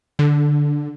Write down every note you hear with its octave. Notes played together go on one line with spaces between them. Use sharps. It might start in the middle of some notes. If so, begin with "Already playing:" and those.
D3